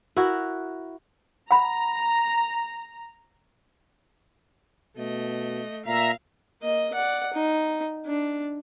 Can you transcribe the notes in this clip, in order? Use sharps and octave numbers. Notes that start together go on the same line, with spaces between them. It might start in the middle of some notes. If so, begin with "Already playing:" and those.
E4 F#4 A#4
F#5 A#5 B5
B2 A3 D#5
A#2 E5 F5 A#5
A#3 D#5
D5 F#5
D#4
D4